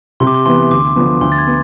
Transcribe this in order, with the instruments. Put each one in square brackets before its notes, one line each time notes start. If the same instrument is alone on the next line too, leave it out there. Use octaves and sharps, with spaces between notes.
[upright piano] C3 [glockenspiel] C6
[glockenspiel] D6
C6
[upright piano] E3 [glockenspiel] C6
[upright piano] B3
[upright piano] D2 [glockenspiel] D6
[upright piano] D3 F3 B3
[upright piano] D2 [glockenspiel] C6
[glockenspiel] A6
G#6
[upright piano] B3